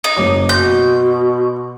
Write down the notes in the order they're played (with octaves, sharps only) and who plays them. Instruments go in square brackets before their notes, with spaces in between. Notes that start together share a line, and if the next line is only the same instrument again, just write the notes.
[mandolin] D#4
[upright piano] F#1 C#5 D6
[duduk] B2 [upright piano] C6 [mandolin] G6